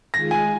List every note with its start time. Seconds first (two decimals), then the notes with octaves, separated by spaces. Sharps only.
0.14 D#3 G#3 F4 G#4 A#6
0.31 G#5